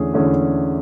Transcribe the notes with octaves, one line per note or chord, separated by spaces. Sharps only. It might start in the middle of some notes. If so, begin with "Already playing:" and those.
Already playing: E2 D3 A3 C#4 G#4
E2 D3 A3 C#4 G#4